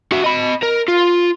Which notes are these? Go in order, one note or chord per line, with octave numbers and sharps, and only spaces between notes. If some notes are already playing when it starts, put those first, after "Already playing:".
F#4 E5
D#5 B5
A#4
F4